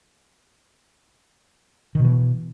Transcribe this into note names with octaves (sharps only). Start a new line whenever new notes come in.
B2 D#3 E3